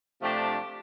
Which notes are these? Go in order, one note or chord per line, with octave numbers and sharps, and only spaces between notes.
C3 F3 A3 D4 G4